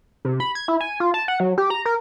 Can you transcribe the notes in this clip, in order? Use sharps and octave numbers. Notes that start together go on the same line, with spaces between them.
C3
B5
G#6
E4
G#5
F4
A5
F#5
F#3
G4
A#5
A#4